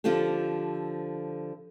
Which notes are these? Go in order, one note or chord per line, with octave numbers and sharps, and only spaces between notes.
D3 F3 C4 F4 G4 A4